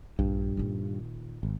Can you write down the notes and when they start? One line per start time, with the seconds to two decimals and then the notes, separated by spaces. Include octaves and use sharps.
0.19 A#1 G2
0.57 A#2 D#3
1.43 G#1